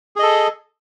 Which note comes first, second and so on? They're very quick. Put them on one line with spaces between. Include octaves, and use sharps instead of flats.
G#4 D#5 A4